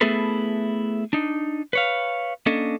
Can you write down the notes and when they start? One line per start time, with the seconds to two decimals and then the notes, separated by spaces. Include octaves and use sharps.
0.01 A3 B3 E4 G#4 A4 B4
1.13 D4 D#4
1.73 B4 C#5 F5
2.46 A#3 C#4 D4 A4 D#5